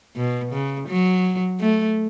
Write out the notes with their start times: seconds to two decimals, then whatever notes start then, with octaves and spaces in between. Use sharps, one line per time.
0.16 B2
0.52 C#3
0.88 F#3
1.60 A3